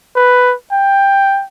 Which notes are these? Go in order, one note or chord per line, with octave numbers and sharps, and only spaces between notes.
B4
G5